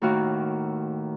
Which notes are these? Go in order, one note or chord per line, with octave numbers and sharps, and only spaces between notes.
D#2 A2 D#3 F#4 F5